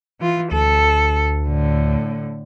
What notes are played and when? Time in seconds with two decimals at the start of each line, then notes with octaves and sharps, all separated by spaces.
0.20 E3 F4
0.52 D2 A4
1.48 A2 D3